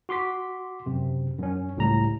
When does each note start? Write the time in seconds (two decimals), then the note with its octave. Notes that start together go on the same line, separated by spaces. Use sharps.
0.09 F#4 C6 D6 B6
0.86 F#2 C3
1.38 F#2 C#4
1.77 C#2 A2 G3 A#5